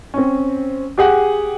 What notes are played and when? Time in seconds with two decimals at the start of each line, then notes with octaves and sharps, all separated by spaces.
0.14 C4 C#4
0.98 G4 G#4 F#5